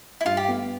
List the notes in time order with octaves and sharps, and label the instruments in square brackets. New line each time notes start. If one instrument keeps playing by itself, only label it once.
[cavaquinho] E4
[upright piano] G2 [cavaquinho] F4
[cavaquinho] G4
[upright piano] B3